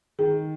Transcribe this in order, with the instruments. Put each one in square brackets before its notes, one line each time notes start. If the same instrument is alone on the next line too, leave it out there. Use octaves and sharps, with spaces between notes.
[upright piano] D#3 [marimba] G#4